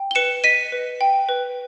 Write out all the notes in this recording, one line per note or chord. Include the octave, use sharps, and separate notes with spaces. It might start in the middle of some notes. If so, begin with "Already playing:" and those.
Already playing: G5
G7
B4 C#7 E7
D#5 B6 D#7
B4
G5
B4